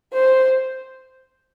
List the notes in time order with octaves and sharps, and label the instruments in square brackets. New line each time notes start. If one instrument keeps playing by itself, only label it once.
[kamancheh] C5